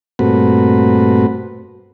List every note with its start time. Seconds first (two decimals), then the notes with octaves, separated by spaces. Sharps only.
0.19 G2 A#2 A3 C4 F#4 B4